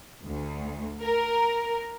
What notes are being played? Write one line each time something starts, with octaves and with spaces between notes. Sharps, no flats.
D2
A#4